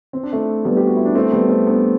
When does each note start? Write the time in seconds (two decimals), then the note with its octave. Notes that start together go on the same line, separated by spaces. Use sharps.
0.13 C4
0.23 D4
0.32 A3 C4
0.65 G3 B3
0.77 G4
0.87 F#4
0.97 E4
1.05 D4
1.15 A3 C4
1.32 G3 B3
1.49 A3 C4
1.66 B3 D4